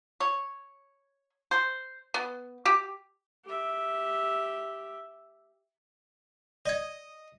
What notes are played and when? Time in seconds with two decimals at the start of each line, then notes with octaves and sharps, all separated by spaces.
0.20 C#5
1.51 C5
2.14 B3
2.65 G4
3.45 G4 E5
6.65 D5 D#5 G#6